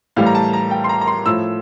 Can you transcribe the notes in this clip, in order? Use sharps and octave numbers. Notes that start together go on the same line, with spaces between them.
A2 E3 G3 F5
A#5
A5
A#5
G5
C6
A#5
A#5
C6
A2 F3 E6